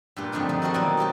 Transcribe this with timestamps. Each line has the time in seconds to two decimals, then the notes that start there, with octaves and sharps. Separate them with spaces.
0.17 G2 A#2 G4
0.32 F2 D3 A3 C4 D4 D#4
0.49 F2 D#3 D4
0.62 D#4 F#4 A4 A#4 C5 D5
0.74 B2 D#3 F#3 A#3 E4
0.97 C4 G4 A4 D#5